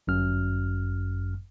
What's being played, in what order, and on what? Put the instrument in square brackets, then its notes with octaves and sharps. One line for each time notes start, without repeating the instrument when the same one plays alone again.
[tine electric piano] G1 F#2 F6